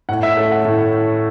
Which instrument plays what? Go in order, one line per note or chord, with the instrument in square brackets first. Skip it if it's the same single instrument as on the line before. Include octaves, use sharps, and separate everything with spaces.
[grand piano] A2 F#5
E5
A3 C#4 E5
F#5
A2
C#5